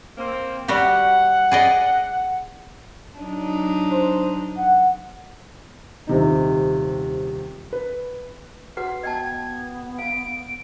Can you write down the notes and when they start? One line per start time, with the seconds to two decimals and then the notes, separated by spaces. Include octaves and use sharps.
0.18 A#3 C4
0.68 G3 F#4 G4 F#5
1.51 G#4 D5 D#5
3.20 F#3 D4 D#4
3.91 C5
4.58 F#5
6.07 D#1 C3 D#4
7.73 B4
8.77 F#4 B4 F#5
9.03 B3 D#5 G5 A5 G#6
9.99 F5 D7